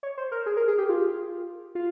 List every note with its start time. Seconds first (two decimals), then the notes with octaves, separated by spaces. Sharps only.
0.03 C#5
0.18 C5
0.32 A#4
0.46 G#4
0.57 A#4
0.68 G#4
0.78 G4
0.89 F4
1.75 F4